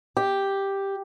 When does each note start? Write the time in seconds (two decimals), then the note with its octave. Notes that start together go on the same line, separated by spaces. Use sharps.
0.17 G4